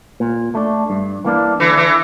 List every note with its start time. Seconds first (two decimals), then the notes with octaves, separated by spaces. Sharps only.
0.20 A#2
0.55 A3 D4
0.90 G2
1.25 E3 A#3 D4
1.60 D3 E3
1.77 E3